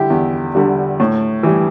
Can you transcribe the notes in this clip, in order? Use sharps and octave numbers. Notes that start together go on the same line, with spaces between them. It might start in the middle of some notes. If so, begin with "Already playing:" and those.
Already playing: D3 G3 E4 G4
E2
D3 G3
A2
E3 G3